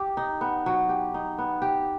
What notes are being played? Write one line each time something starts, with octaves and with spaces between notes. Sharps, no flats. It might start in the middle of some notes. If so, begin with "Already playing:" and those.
Already playing: G4
D#4
B3
F#3
G4
D#4
B3
G4